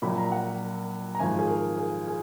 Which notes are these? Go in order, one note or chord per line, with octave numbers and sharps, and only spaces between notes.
A#1 A#2 F#3 B5
A#5
F#5
A#5
G#1 G#2 F3 G#5
G#4
A#4
G#4
G#4